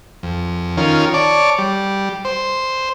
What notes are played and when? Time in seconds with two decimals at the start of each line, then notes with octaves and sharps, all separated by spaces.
0.23 F2
0.78 D#3 C#4 F4 A#4
1.14 C#5 D5 A5 D6
1.58 G3
2.25 C5